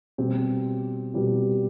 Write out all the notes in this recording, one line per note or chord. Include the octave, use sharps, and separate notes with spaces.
B2 G3 C4 G4
B2 G3 C4 G4